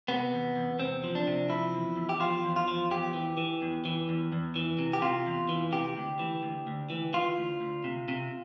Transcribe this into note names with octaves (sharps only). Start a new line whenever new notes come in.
C3 B3
E2
E2
C3 C4
F3
D4
C3
F3 E4
E2
E2
G4
F3 F4
E2
F4
F3
E2 G4
E3
E3
E2
E3
E2
E2
E3
C3
G4
C3 F4
E2
E3
C3 G4
D2
E3
D2
D2
E3
E3 F4
D2
D2
C3
C3